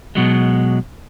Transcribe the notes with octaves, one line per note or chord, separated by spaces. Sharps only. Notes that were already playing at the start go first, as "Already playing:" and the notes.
B2 F#3 G#3